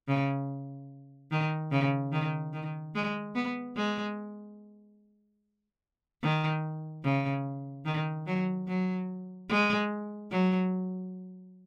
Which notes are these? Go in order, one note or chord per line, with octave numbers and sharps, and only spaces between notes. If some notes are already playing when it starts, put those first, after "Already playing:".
C#3
D#3
C#3
D#3
D#3
G#3
B3
G#3
D#3
C#3
D#3
F#3
F#3
G#3
F#3